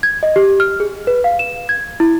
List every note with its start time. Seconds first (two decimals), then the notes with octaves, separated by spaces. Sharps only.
0.03 G#6
0.23 D#5
0.36 G4
0.60 F6
0.80 G#4
1.07 B4
1.24 F5
1.39 E7
1.69 G#6
2.00 E4